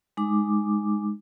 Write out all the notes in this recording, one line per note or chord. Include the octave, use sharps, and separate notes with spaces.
G#3 D#4 D6